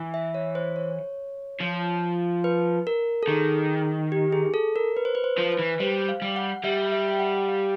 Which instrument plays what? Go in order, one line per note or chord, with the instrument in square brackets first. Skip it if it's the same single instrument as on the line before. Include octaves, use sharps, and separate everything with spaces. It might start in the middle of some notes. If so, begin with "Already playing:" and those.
Already playing: [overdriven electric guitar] E3
[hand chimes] E5
C#5
C5
C#5
[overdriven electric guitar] F3
[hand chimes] B4
A#4
A4
[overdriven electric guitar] D#3 [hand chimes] G#4
[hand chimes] G4
G#4
A4
A#4
B4
C5
B4
C5
[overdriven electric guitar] F3
[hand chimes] B4
[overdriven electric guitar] E3
[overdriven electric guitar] G3 [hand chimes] C5
[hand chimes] F5
[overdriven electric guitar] G3
[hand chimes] F#5
[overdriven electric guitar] G3 [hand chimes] E5
[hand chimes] E5
G5
F#5
F5